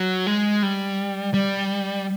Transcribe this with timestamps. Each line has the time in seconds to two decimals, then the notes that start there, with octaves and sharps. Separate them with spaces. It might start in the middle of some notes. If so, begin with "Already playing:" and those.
Already playing: F#3
0.26 G#3
0.62 G3
1.34 G3